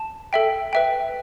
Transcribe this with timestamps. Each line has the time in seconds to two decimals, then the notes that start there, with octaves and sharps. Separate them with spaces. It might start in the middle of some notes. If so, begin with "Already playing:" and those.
Already playing: A5
0.33 A4 E5 G5
0.73 B4 E5 G5